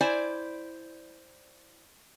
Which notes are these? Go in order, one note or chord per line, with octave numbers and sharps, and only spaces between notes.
E4 C5 D5 G#5